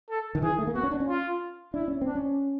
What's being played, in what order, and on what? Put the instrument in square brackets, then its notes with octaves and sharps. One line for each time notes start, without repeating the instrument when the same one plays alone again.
[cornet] A4
[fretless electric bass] D#3
[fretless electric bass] E3 [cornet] G#4
[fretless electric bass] D#3
A3
A#3
[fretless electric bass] B3 [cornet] F#4
[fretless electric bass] C#4
D4
C#4
[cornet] F4
[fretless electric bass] D4 [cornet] E4
[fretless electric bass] C#4
[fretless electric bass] C4 [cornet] D4
[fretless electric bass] C#4